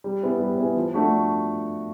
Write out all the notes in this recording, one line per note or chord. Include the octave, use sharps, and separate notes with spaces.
G3
B3 E4 G#4
G3
B3 E4 G#4
F3
A3 D4 F#4